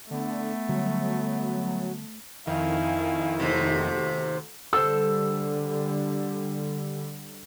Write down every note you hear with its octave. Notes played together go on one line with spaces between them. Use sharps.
D3 A3 B3
D3 F#3 G3
F2 D#3 E4 F5 G#5
D#2 C3 A3 F#4
D3 G3 A4 C5 E6